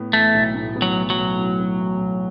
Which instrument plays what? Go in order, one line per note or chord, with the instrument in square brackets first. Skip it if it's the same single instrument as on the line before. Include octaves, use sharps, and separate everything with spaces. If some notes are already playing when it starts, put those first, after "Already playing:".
Already playing: [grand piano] A2 B3
[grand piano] E3 [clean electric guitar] A3
[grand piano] B1
A2
B3
[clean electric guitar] F#3
[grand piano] E3
[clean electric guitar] F#3
[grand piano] B1
A2
B3
E3
B1